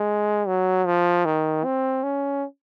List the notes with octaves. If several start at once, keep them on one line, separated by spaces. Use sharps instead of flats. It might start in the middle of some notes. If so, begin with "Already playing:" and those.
Already playing: G#3
F#3
F3
D#3
C4
C#4